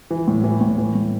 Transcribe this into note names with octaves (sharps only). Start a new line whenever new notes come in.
E3
A2
E3
A2
E3
A2